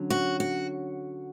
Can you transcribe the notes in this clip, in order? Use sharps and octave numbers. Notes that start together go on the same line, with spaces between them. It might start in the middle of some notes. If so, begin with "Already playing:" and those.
Already playing: D3 F#3 C#4
F#4
F#4